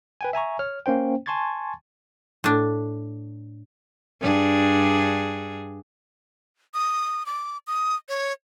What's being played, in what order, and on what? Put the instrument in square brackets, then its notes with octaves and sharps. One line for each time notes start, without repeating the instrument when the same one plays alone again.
[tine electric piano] B4 G5 G#5
E5 G#5 A#5 C#6
C#5 F6
A#3 C#4 C5 G5
G#5 A5 C6 C#6 G#6 A6
[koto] A2 D4
[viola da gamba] G2 D4 G#4
[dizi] D#6
D6
D#6
C#5